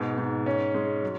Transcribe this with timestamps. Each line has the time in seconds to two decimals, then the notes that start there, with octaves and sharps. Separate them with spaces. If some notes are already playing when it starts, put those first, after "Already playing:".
Already playing: G#2 B2
0.18 G#2
0.46 C#4
0.74 G#3
1.03 F#3